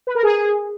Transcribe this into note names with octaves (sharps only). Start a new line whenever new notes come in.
B4
A#4
G#4